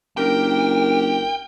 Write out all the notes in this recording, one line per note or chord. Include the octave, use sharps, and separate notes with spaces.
F#1 D4 G4 A#4 G5